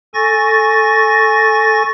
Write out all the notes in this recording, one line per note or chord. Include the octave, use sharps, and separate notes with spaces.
A4 G#5 C#6 A6 A#6